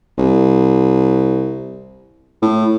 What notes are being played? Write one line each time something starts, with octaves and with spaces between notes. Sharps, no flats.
C2
A2